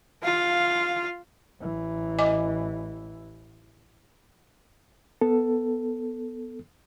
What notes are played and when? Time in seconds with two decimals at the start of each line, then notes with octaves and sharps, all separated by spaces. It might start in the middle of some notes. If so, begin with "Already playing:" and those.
0.23 F4 F5
1.61 A1 E3
2.19 D#5 G#5 D6
5.21 B3 A4